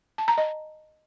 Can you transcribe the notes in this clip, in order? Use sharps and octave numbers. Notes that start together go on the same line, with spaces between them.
A5
A#5
D#5